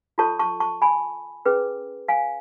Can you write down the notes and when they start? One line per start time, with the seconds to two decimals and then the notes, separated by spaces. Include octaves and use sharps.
0.18 F4 A4 C#5 A5 C#6
0.39 A5 C#6
0.60 A5 C#6
0.82 G#5 B5
1.45 C#4 G#4 B4
2.08 F5 G#5